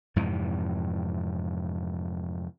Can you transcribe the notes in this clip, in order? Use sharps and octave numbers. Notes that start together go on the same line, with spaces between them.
F2 G#2 C3 E3